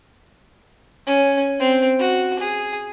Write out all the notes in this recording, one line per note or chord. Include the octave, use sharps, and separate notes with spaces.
C#4
C4
F#4
G#4